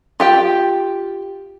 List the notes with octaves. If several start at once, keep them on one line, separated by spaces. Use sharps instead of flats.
F4 G4 G5